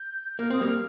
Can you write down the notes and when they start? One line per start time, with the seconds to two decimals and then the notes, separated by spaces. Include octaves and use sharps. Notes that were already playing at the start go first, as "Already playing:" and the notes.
Already playing: G6
0.39 A#3 F6
0.50 C4 D#6
0.61 G3 A#3
0.67 F6